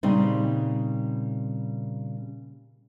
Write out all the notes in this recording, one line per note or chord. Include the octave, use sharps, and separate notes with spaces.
A#2 C#3 G3 C4 D#4